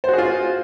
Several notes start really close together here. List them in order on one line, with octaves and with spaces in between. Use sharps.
C5 F#4 G#4 F4